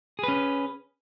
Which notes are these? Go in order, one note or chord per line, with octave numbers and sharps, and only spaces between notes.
C#4 G#4 B4